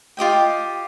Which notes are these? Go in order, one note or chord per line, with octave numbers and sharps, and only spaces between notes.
F4 G4 D#5 G5